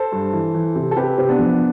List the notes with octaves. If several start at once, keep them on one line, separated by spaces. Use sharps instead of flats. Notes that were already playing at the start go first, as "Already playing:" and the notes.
Already playing: A4 C5
G2
E3
E3
C3
A4
C3 G4 B4
C3 C4
B3 D4
F2